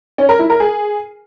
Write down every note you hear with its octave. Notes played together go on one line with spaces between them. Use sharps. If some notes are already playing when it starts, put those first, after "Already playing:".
C#4
A#4
E4
A#4
G#4